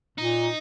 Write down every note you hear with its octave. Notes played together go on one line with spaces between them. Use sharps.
A#2 D#4